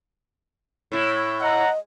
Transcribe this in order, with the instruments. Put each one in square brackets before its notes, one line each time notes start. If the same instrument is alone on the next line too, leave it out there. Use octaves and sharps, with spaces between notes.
[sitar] A2 E4
[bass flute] D#5 [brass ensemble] F#5 A#5